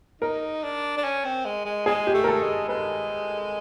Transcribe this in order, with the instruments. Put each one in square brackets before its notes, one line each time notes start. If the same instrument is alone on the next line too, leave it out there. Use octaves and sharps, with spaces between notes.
[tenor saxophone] D#4 [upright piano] A#4
[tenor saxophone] D4
D4
C#4
C4
G#3
G#3
[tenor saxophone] G#3 [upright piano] G#4
[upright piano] G4
[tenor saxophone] A3
[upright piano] A#4
A4
[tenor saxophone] G#3
[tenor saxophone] G#3 [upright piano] B4